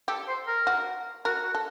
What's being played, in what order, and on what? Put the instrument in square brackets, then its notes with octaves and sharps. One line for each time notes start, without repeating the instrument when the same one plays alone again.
[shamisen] G4 [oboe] A4
[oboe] C5
A#4
[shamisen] F#4
[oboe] F#4 [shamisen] A#4
[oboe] F#4
[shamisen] A4